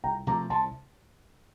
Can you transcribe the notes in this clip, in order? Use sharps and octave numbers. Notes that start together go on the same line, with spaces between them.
C2 G5 A#5
C3 F3 A3 A#5 D6
C2 A5 C6